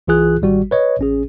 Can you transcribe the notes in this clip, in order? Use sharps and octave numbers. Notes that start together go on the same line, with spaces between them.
C2 E3 F4 G#4 F#6
G#1 G3 F#4
B4 C#5 D#5
A1 C#4 G#4